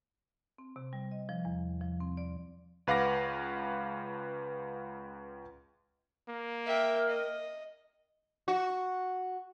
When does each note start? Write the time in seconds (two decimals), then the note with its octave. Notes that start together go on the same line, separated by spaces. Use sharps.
0.58 C4
0.76 C3
0.93 G3
1.11 D#5
1.29 F3
1.45 E2
1.81 F3
2.01 C4
2.17 D5
2.87 C#2 B4 F5 F#5 D6 A#6
6.29 A#3
6.66 A#4 E5 G5
7.09 D#5
8.48 F#4